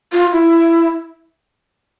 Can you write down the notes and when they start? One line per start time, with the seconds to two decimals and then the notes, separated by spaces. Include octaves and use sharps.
0.12 F4
0.32 E4